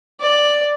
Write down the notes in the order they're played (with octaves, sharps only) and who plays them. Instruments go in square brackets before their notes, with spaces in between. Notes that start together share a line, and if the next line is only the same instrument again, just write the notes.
[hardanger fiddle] D5